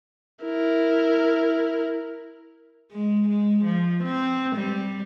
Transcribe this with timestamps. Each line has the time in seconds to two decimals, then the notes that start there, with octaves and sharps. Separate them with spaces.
0.44 E4 A#4
2.92 G#3
3.29 G#3
3.65 F3
4.04 C4
4.56 G3